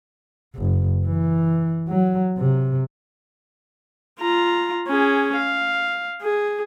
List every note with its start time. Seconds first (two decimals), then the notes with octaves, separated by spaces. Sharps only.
0.56 F#1
1.06 E3
1.89 F#3
2.38 C3
4.20 F4 A#5
4.88 C#4 G#4
5.37 F5
6.22 G#4